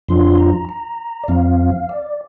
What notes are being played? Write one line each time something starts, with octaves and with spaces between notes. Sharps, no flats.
F2 F3 D4 F4 C6
A#5
A#5
D5
F2 F3 C4 F5
D5